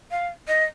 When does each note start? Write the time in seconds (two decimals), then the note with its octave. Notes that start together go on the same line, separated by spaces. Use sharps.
0.11 F5
0.48 D#5